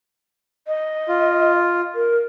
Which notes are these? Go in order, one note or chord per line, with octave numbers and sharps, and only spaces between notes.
D#5
F4
A#4